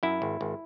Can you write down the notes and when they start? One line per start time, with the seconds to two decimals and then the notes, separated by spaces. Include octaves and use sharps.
0.03 F#2 E4
0.22 G#1
0.41 G#1